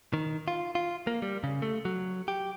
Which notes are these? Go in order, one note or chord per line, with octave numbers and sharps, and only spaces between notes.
D#3
F4
F4
A#3
G3
C#3
A3
F#3
G4